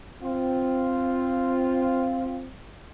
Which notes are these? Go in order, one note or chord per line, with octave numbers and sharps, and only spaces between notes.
C4 F4